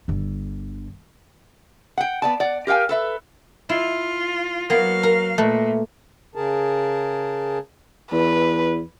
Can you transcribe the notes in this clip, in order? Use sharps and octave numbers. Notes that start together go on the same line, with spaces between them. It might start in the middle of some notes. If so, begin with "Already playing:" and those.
G1 D3
F#5 G5
B3 D5 A5
D5 F#5
G4 A#4 F5 G5 G#5
A4 B4 E5
E4 F4
F#3 A#3 B3 F5
A#4
A#2 A3 B4
C#3 G#4 A#4 A5
E2 B4